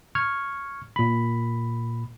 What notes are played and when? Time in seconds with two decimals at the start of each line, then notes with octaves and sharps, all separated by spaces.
0.15 C#6 F6 G#6
0.96 A#2 B5